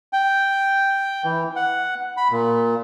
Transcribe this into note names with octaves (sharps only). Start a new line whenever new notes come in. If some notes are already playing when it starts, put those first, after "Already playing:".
G5
E3
F#5
B5
A#2